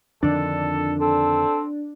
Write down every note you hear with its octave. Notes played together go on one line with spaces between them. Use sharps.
F2 D3 D#3 D4 A4
C4 A4